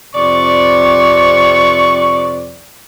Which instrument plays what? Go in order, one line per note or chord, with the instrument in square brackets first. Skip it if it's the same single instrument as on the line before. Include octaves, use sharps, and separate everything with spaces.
[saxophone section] F2 C3 D5 [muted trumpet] C#6